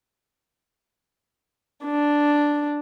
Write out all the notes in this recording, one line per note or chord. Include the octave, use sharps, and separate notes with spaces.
D4